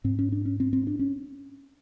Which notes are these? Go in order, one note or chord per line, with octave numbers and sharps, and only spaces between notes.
G#2 C4
C#4
D4
C#4
C4
C4
D4
C#4